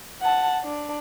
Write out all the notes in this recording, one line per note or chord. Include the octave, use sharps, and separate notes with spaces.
F#5 A5
D4